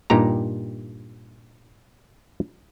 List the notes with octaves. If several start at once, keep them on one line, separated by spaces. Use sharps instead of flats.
G2 A#2 D#4 G4 A#5